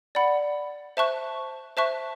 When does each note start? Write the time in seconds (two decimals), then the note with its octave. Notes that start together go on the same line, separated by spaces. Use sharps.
0.15 D5 F#5 B5
0.97 C5 E5 A5 C#6 F#6
1.77 C5 E5 A5 C#6 F#6